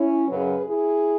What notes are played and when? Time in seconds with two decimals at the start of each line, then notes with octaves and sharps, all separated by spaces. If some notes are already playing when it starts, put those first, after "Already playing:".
Already playing: C#4 E4
0.28 F#2 C#3 F#3 G#4 B4
0.67 E4 G#4